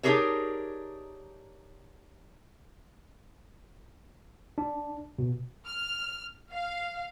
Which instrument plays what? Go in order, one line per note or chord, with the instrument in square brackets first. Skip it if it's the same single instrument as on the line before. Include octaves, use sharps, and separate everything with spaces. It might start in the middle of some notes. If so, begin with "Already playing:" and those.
[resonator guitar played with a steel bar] D4 D#4 G4 G#4 A#4 C#5
[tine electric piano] D4
B2
[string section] F6
[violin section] F5